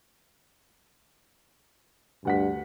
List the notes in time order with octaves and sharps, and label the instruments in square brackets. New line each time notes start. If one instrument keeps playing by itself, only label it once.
[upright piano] D2 F#5 B6 [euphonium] G2